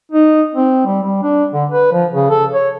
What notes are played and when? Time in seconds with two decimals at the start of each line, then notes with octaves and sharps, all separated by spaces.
0.12 D#4
0.55 C4
0.86 G3
1.03 G3
1.23 D4
1.53 D3
1.70 B4
1.92 F3
2.13 C#3
2.30 A4
2.53 C#5